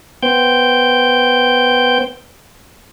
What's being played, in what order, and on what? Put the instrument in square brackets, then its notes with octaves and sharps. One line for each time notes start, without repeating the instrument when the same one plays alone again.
[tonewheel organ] B3 C5 G5 G6